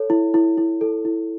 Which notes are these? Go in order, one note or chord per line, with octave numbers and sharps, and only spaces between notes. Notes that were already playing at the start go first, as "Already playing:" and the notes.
Already playing: A4 C#5
E4
E4
E4
A4
E4